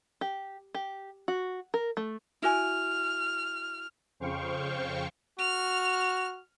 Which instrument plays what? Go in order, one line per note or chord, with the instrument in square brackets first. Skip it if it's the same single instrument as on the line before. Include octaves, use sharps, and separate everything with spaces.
[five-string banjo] G4
G4
F#4
A#4
A3
[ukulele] E4 F#4 G#5 [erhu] F6
[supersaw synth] F2 C#3 C5 F5 G5 C#6
[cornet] F#4 [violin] F6